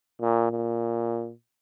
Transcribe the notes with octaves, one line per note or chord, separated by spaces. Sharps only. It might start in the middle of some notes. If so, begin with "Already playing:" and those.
A#2
A#2